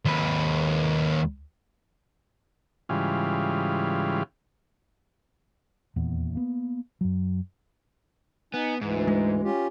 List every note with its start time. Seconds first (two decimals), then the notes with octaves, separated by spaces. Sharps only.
0.05 D#2 B4
2.89 G#2 C#3 E3 G3 F4
5.96 D#1 E2 A#2 B3
6.35 A#3 B3
7.01 F#2 F#3
8.54 B3 D#4 G#5
8.81 D2 G#2 E3
9.07 G#3
9.44 C#4 F4 G4